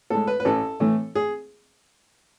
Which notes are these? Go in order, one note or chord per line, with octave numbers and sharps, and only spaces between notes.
A2 G#3 A4
B4
B4
A1 A4
A2 E3 A3
G#4